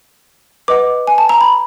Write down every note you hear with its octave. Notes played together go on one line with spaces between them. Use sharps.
B4 D#5 F#5 D6
G#5
A5
A#5
B5